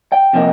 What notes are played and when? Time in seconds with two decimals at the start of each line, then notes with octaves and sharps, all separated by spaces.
0.12 G5
0.33 C3 F3 A#3 D#4